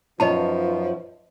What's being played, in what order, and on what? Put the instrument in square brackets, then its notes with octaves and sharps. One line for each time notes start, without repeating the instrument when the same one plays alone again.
[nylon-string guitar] F#2 C#5 [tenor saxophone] F3 [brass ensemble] D#4 F4 B4 [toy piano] D#5 A5